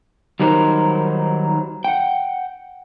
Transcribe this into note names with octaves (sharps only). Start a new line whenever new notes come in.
D#3 F#3 G3 D#4 A#4 C5
F#5 G5